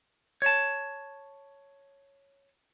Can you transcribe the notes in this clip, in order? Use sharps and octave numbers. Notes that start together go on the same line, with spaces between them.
C#5 A5